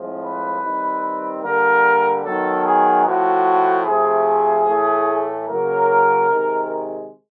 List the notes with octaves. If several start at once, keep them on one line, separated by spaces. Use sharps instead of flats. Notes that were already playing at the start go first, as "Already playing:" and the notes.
Already playing: A2 F3 G#3 C4
B4
D#3 G3 C4
D3 G3 A#3 A#4
D#3 F#3 B3 A4
G#4
A2 F3 A3 F#4
C3 F3 A3 G#4
A2 E3 A3
C#3 F#3 A#3 A#4
C3 D#3 G#3